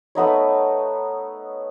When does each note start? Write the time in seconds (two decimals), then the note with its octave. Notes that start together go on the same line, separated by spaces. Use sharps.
0.15 A3 B3 D#4 C#5